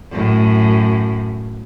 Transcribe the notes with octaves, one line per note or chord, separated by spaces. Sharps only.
F#2 A2